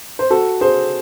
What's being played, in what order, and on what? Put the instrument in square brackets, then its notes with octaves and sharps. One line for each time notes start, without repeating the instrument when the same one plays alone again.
[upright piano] C5
F#4 A4
G#4 C5